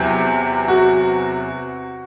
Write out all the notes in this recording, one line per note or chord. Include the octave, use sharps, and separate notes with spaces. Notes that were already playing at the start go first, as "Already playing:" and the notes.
Already playing: E2 C3 F#3 G4
F#4